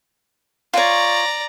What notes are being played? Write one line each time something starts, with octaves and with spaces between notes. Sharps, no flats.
F4 C#5 D5 A#5